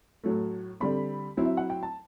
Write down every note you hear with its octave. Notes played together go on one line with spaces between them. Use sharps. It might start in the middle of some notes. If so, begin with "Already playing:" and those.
A2 F#3 A3
D3 G3 C4 B5
F#3 C4 E4
E5
F#5
G5
A5